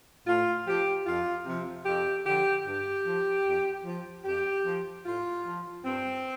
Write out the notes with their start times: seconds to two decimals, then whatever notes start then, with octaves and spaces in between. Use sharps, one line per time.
0.26 A2 F4
0.67 F3 G4
1.06 F2 F4
1.46 C3 F3
1.86 F2 G4
2.26 D3 F3 G4
2.66 G2 G4
3.05 F3
3.45 F2
3.85 F3
4.25 F2 G4
4.65 F3
5.05 A2 F4
5.44 F3
5.84 G2 C4